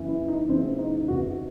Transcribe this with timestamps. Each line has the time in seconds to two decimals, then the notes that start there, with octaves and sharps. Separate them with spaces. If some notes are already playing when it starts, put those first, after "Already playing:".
Already playing: F#1 F#2 E3
0.08 E4
0.28 D#4
0.48 F#1 F#2 E3 C4
0.78 D#4
1.08 E2 C3 D#3 F#4